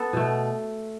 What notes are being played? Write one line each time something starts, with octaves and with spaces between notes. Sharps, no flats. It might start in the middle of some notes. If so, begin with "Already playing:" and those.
Already playing: B3 A4
B2 A3